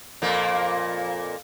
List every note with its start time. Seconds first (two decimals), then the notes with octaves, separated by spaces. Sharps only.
0.22 F2 A#2 A#3